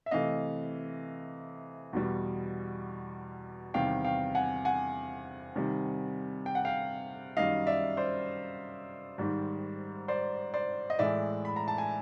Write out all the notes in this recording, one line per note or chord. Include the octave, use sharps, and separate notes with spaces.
E5
C3 E3 A3 D#5 F5
E2 B2 G3
E2 C3 D#3 G3 F5 G5
F5 G5
F#5 G#5
F#5 G#5
C3 D#3 G3
G5
F#5
F5 G5
F#2 D#3 G3 D#5 F5
D5 E5
C5 D5
G#2 D#3 G3
C5 D5
C5 D5
D#5
A2 E3 G#3 D5 E5
B5
A#5
A5
G#5